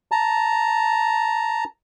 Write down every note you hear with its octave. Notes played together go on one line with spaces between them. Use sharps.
A5 A#5